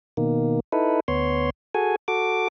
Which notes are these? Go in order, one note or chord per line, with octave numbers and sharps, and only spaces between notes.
B2 D#3 A#3
D#4 E4 A4 B4
D2 B3 C#5 C6
F#4 G#4 A4 G#5
F#4 A4 D6